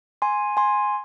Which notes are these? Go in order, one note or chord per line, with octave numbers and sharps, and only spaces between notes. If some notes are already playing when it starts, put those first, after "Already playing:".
G#5 C6
G#5 C6